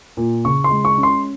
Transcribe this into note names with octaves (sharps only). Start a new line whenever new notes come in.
A#2
C#3 C#6
C6
G#3
C#6
C#4
C6